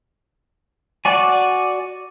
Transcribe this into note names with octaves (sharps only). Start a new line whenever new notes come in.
F#4 D5 G#5